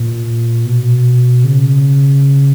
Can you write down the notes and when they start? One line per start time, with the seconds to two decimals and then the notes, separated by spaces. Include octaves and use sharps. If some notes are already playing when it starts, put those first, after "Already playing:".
Already playing: A#2
0.65 B2
1.44 C#3